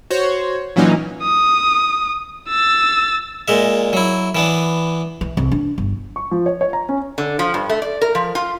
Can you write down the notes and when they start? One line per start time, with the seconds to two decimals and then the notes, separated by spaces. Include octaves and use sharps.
0.10 F#4 C5 C#5
0.76 A#2 E3 F#3 A#3 C#4 D#4
1.23 D#6
2.49 E6 A6
3.48 A#2 G#3 E5
3.93 F#3 E4
4.35 E3 B3 D4
5.21 E3
5.37 C2
5.52 D4
5.78 G1
6.16 C#6
6.31 F3
6.46 C#5
6.61 C#5
6.73 A#5
6.89 C#4
7.18 D3
7.39 F3
7.54 G2
7.69 A3
7.82 D5
8.01 A#4
8.15 F3
8.35 F4